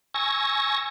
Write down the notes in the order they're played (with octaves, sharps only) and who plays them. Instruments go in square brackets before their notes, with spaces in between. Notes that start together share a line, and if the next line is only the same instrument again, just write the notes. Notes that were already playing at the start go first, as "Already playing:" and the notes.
[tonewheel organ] G#5 C#6 E6 G#6 A#6